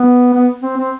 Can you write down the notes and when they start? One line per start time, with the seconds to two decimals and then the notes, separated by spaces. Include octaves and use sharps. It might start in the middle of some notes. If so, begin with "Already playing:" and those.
Already playing: B3
0.34 B3
0.63 C4
0.77 C4